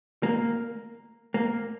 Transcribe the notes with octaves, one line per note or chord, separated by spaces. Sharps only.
A#3
A#3